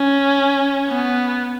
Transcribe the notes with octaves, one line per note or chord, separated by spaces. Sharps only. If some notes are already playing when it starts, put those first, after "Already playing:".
Already playing: C#4
B3